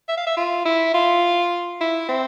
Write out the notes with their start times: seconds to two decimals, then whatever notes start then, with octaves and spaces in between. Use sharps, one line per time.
0.09 E5
0.17 F5
0.27 E5
0.37 F4
0.65 E4
0.94 F4
1.81 E4
2.09 C4